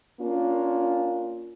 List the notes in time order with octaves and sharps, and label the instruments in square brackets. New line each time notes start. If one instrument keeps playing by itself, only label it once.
[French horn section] A#3 C#4 D4 F4